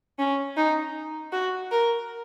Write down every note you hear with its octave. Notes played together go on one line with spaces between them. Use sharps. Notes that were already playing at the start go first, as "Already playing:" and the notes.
C#4
D#4
F#4
A#4